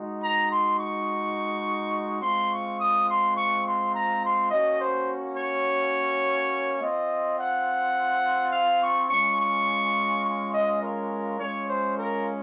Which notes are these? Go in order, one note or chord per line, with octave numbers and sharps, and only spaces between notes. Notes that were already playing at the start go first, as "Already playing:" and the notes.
Already playing: G#3 D#4 F#4
A#5
C6
C#6
G#3 C4 F4 C6
C#6
D#6
C6
C#6
C6
A#5
C6
A#3 C#4 F#4 D#5
C5
C#5
C4 F4 D#5
F#5
F5
C#6
G#3 C#4 F4 C#6
C#6
C#6
D#5
A#4
G#3 C#4 F4 C#5
C5
A#4